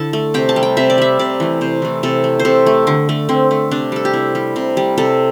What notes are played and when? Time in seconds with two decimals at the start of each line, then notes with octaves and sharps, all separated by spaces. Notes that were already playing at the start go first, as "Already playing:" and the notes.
Already playing: D3 E4 A4 A5
0.13 A3
0.34 C3 G5
0.49 A5
0.56 G3
0.63 G5
0.77 C3 E5
0.90 D5
0.98 G3 E5
1.19 C3 D5
1.40 E3 A3
1.61 C3 C5
1.82 E3 A3
2.03 C3 A4
2.24 A3
2.39 C5
2.45 C3 A4
2.66 A3
2.87 D3
3.09 A3
3.29 D3 C4
3.51 A3
3.71 C3 D4
3.92 G3 A4
4.05 G4
4.13 C3 E4
4.35 G3
4.56 C3
4.77 G3
4.98 C3 A4